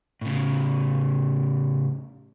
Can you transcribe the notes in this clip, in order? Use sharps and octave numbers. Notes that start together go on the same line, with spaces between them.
A2 C#3